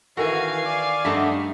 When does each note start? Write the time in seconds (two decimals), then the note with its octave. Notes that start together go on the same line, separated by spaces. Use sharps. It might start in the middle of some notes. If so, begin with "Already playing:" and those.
0.17 D#3 E3 F#4 A4 A#4 F5 F#5 G#5
0.66 D5
1.05 G2 A3 D#4 E5 F#5